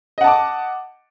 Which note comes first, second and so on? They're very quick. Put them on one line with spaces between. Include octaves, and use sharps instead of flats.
D#5 F#5 A5 D6